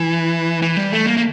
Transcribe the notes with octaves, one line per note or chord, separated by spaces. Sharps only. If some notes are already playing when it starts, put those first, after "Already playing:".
Already playing: E3
E3
G3
A3
A#3
A#3